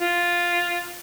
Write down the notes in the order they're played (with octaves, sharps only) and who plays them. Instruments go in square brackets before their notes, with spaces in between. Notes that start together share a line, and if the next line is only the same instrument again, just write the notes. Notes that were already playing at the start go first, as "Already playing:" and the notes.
[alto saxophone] F4